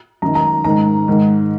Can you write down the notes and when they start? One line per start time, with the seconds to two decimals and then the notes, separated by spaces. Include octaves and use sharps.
0.22 F#2 D#3 A#5
0.35 A#5
0.64 G#2 D#3 A#5
1.08 G#2 D#3